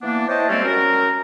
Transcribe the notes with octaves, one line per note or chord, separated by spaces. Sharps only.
E3 A#3 B3 D4
E4 C5 C#5 D#5 G5 A5
G3 G#3 A#3 C4 C#4 A4
F#3 C#4 F#4 A#4